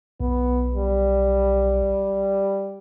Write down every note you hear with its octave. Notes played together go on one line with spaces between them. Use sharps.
B1 B3
G3